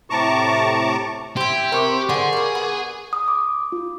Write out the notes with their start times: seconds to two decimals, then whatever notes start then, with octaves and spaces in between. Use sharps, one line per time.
0.10 A2 C3 A5 A#5 C#6 D6
1.37 C4 E4 G4
1.72 C3 C4 E4 A#4 C#6 D6
2.09 D3 C4 G#4
2.33 G3 A#3
2.55 B3
3.13 D#6
3.28 D6
3.72 F4